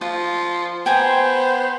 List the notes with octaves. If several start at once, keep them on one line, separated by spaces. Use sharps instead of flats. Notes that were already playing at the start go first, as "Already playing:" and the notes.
F3 F4
B3 C5 G5 G#5 A#5